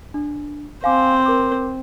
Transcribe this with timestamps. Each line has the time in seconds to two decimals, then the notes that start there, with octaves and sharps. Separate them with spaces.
0.14 D4
0.84 C4 C5 F5 G#5 D6
1.26 A#4 D6